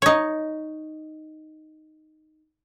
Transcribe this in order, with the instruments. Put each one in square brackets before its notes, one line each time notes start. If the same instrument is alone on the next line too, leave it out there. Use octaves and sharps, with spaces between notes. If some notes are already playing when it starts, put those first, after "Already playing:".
[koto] D#4 C#5